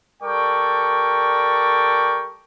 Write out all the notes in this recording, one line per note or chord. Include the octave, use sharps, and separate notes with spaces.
G3 A4 A#4 D5 G5 C#6